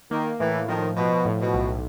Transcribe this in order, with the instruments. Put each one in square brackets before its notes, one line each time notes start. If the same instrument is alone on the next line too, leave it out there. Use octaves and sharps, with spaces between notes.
[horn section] D#3 [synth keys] A#3
[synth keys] A2 [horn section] E3
[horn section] D#3 [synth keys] F3
[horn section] B2 [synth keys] F3
[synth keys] A2
[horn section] B2
[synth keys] B1